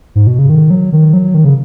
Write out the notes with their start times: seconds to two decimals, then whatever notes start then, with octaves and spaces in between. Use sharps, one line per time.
0.15 G#2
0.27 B2
0.39 C#3
0.50 D#3
0.70 F#3
0.92 D#3
1.13 F#3
1.35 D#3
1.45 C#3